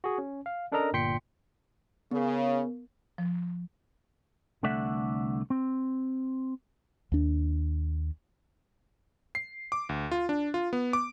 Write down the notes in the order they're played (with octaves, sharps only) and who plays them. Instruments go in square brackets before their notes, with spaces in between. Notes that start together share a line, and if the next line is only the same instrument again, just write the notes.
[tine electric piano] F#4 G#4
C#4
F5
C#4 D4 A4 A#4 D#5 A#5
G1 A#2 G5 C6 B6 C#7
[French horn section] C#3 [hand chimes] B3 A#4
[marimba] F3
[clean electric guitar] C2 D3 A3 D5 E5 F#5
C4
[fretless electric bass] D#2 D4
[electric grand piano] C7
D6
D2
F4
D4
F4
B3
D6